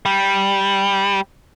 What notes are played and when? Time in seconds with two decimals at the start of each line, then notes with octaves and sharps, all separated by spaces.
0.06 G3